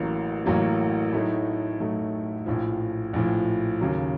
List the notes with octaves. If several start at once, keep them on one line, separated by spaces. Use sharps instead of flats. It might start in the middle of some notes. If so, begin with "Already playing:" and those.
Already playing: A1 A2 F#3 A#3
A1 A2 F#3 A#3
A2 F#3 A3 D#4
A2 F#3 A3 D#4
A#1 A2 F3
A#1 A2 F3
D#2 C#3 F#3